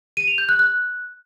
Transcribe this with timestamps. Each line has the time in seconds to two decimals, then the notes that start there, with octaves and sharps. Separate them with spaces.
0.17 D#7
0.28 F7
0.38 G6
0.49 F#6
0.59 F#6